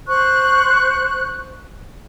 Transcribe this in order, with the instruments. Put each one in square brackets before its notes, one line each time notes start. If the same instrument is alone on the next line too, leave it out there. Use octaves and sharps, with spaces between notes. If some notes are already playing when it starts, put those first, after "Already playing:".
[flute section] C5 C#6 F#6